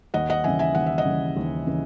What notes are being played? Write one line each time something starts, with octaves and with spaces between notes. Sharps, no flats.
D#2 D#5 F#5
D#5 F#5
C#3 E3 E5 G#5
E5 G#5
D#2 F#5
E5
D#5 F#5
C#3
E3
D#2
C#3 E3